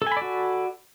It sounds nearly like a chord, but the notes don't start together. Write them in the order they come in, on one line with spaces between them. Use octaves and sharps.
A4 G#5 B5 D5 F#4